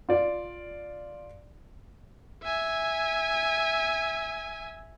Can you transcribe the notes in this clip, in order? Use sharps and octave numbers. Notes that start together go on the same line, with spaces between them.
F4 D5
E5 G#5